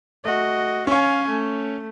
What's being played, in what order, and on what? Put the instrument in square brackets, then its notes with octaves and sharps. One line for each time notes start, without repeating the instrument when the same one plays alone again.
[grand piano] A3 [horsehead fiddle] F#4 D#5
[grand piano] C#4 C#5 [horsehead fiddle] F5 G#5
[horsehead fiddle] A3